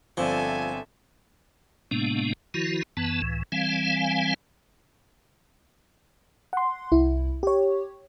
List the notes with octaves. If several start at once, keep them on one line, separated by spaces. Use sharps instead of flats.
G1 F3 C4 A4 D5 E5 G#5
A2 C3 G#3 A#3 B3 D4
D#3 F3 E4 F#4
F#2 E3 B3 A5
C#2 A2 E3
E3 G3 C4 F5 G#5
F#5 C6
C2 E4
G4 C#5